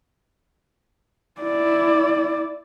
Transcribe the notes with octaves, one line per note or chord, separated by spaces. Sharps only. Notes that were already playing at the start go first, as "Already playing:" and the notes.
E4 D5